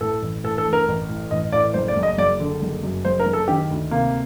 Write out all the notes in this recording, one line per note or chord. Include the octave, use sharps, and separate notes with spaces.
A2 A4
A1
A2 A4
A4
A1
A#4
A1
A2
A1 D#5
A2 D5
F#1 C5
D5
F#1
D#5
F#1 D5
D3
F#1
F#2
F#1 C5
A#4
F#1
A4
D#3 G4
D2
C3 A#3